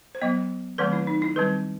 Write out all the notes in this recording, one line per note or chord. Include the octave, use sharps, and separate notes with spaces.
C5
F#3 B3 D#5
D#3 F#3 A3 C4 B4
E4
D#4
E4
D#3 G3 C4 B4